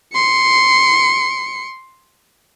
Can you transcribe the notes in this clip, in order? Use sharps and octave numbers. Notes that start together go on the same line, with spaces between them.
C6 C#7